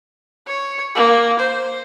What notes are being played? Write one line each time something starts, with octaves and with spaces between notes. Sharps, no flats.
C#5
A#3
C5